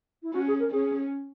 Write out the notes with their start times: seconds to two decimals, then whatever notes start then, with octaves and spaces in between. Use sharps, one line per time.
0.23 E4
0.33 C#4 F#4
0.47 G#4
0.59 A#4
0.71 C#4 G#4